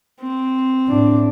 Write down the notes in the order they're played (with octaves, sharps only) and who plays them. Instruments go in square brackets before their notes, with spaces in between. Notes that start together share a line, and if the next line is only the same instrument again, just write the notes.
[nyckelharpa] C4
[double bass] A2 D4